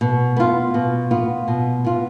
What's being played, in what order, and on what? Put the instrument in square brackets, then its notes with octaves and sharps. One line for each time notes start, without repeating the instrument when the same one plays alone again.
[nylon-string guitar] B2
B3 F4
B2
B3 F4
B2
B3 F4